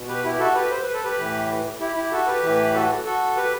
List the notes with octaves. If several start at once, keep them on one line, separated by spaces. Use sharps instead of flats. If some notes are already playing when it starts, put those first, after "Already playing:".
Already playing: B2
G4 B4
E4 G4
F#4 A4
G4 B4
C5
B4
A4
G4 B4
A2 E3
E4 G4
E4 G4
F#4 A4
G4 B4
A2 E3
F#4 A4
F#4 A4
G4 B4